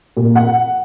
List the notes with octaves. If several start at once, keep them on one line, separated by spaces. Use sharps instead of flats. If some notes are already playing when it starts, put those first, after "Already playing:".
A#2
F#5